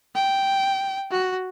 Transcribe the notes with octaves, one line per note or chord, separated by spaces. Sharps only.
G5
F#4